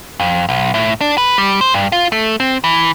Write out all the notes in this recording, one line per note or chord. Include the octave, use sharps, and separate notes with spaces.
F2
B1
A2
D4
B4
G3
C5
G2
F4
A3
C4
E3